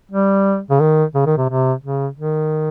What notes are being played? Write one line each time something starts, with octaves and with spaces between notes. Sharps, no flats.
G3
C#3
D#3
C#3
D#3
C3
C3
C#3
D#3